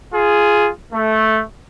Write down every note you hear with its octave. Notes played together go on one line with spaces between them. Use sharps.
F4 G#4
A3